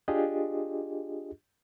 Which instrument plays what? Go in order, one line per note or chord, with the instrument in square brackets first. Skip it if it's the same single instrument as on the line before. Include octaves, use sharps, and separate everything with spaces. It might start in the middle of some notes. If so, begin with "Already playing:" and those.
[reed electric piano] D4 F4 G4 G#4 D#5